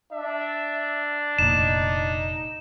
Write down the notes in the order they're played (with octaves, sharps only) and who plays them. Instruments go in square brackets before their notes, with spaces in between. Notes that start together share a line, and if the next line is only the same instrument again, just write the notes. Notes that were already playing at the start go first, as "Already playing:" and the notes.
[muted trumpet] D4 [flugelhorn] E5
[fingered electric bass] F1 A#2 [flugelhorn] D#4 [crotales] E7